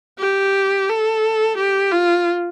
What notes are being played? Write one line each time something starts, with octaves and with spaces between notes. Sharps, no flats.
G4
A4
G4
F4